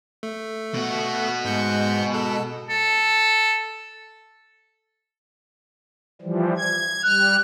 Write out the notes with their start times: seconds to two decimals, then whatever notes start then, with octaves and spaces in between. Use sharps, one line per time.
0.23 A3
0.74 B2 F#4
1.45 G#2 G#3 G6 C#7
2.14 A4
2.69 A4
6.21 E3 F3 G3
6.57 G#6
7.03 G3 F6 F#6